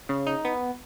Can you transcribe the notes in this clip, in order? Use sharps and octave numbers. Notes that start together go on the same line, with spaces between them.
C#3
D#4
B3